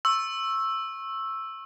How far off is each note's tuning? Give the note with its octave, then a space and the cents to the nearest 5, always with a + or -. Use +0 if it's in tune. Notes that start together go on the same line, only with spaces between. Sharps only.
C#6 -30 E6 +0